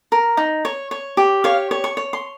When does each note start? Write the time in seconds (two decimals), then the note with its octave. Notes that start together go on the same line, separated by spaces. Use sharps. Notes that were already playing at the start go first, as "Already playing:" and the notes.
0.12 A#4
0.37 D#4
0.65 C#5
0.91 C#5
1.17 G4
1.44 C#5 F5
1.71 C#5
1.84 C#6
1.97 C#5
2.13 C6